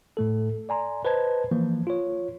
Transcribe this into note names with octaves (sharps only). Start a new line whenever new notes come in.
A2 A3 A4
D5 G#5 A#5 C6
B4 C5 D#5 A5 G#6
E3 F3 A#3
F4 C#5